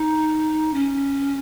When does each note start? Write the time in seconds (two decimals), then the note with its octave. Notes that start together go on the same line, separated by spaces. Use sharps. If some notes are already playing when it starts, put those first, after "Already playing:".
Already playing: D#4
0.74 C#4